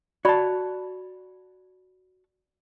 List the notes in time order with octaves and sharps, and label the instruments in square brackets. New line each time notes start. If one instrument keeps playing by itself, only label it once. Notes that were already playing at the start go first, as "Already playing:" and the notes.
[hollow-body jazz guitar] F#4 A5 [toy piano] D5 B5